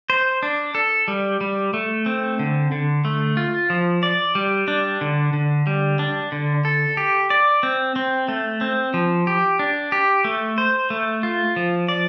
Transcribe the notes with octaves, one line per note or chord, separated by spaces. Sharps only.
C5
D4
A4
G3
G3
A3
C4
D3
D3
A3
F4
F3
D5
G3
D4
D3
D3
G3
D4
D3
A4
G4
D5
C4
C4
A3
C4
F3
G4
D4
G4
A3
C5
A3
F4
F3
D5